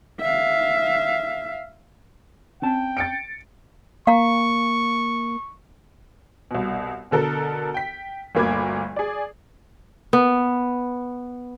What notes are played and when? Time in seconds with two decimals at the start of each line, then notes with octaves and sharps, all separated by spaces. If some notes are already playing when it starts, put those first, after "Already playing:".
0.21 E5 F5
2.62 C4 C#4 G5 A5
2.97 A6 C#7 D7
4.07 A#3 F5 A#5 C#6
6.51 C2 B2
7.11 B2 D3 A4 A#4
7.74 G5 B6
8.35 G1 D2 A#3 B5 D6 G#6
8.96 G#4 D5
10.13 B3